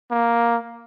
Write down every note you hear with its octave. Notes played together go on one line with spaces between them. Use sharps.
A#3